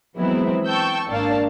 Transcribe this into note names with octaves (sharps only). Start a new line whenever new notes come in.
E3 F#3 G#3 B3 C4 E4
G5 A5 C#6 E6 G6
G#1 A#3 D4 D5 F5 A5